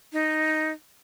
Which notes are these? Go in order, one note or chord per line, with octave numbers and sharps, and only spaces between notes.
D#4